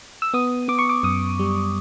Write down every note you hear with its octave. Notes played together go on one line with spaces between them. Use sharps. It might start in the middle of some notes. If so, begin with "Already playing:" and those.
E6
B3 D#6
B3 D6
C#6
D6
F#2 D#6
G3